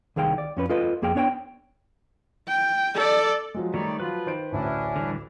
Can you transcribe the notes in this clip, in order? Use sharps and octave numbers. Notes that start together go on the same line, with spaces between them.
C2 D#3 G#4 F5 G5
D5
F2 C#4 B4
F4 A4 B4 D#5
F2 A#3 G#4 F5 G5
B3 D4 C#5 F5 G5
G5
A4 D5
F3 F#3 G#3
D#3 G3 A3 D#4 C#5 D5
F3 F#3 F4 B4 B5
D#3 C5 D7
A1 D2 C#4 D4 E4
D3 E3 G3